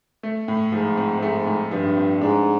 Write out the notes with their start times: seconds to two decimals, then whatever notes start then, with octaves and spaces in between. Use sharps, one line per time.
0.23 A3
0.48 A2
0.72 G#2 F3
0.97 C4
1.22 G#2 A3
1.46 A2
1.71 G2 F3
1.97 C4
2.21 G#2 D4